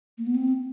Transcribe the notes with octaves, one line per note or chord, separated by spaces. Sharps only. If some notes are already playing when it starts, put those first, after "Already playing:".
A#3
B3
C4